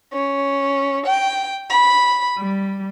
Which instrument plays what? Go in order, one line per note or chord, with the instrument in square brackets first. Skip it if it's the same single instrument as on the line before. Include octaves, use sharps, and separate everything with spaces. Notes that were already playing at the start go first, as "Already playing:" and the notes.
[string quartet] C#4
G5
B5
G3